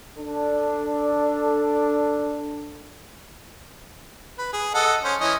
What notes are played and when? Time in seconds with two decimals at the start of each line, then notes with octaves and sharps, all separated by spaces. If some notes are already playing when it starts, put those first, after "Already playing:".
0.18 D4 A4
4.38 B4
4.53 G#4
4.74 A4 D#5 F#5
5.04 C#4 C5
5.21 E3 C#4 D#5